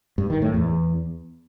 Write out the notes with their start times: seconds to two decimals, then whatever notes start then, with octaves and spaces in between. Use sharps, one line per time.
0.18 G2
0.30 D#3
0.42 A2
0.54 E2